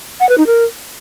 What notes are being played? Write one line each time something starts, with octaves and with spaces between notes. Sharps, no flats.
F#5
B4
D#4
A#4